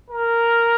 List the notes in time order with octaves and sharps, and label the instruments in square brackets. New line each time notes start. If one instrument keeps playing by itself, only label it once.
[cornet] A#4